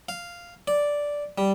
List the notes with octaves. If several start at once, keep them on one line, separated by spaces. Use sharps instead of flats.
F5
D5
G3